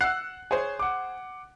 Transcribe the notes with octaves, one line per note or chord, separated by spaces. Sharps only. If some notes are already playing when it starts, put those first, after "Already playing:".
F#5 E6 F#6 C7
G#4 C5 C#5
F#5 D6